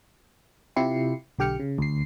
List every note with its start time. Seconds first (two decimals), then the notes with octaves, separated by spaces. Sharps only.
0.76 C3 E4 F4 G4 C7 C#7
1.39 B1 D3 G4 G5 F6 C#7
1.60 C#3
1.78 D2 C7